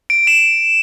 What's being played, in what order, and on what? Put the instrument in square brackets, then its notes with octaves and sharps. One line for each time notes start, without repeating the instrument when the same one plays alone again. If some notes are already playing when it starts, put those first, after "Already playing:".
[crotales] D7
E7